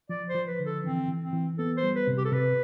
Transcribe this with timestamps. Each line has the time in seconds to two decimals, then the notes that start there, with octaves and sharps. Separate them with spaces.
0.09 F3 D5
0.29 C5
0.34 F3
0.47 B4
0.59 D3
0.66 A4
0.84 E3 C4
1.08 E3
1.21 C4
1.33 E3
1.58 B3 A4
1.77 C5
1.83 G3
1.95 B4
2.07 C3
2.17 G4
2.25 A4
2.32 C3 B4